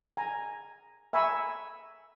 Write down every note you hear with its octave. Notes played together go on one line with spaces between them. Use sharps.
G#5 A#5
E5 G#5 A#5 B5 C#6 E6